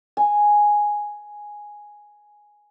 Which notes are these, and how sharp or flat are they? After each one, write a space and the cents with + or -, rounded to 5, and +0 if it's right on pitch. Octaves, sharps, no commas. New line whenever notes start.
G#5 +0